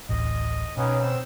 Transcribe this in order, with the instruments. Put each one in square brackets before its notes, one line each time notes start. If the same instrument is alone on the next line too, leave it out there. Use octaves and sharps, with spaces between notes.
[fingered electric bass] D1 A1 [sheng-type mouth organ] D#5
[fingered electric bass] B2 [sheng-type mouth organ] B3 C#4 D#4
[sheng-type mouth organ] C4 E6